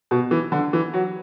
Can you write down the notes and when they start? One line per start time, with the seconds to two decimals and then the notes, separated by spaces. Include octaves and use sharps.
0.11 B2
0.31 E3
0.52 D3
0.73 E3
0.93 F#3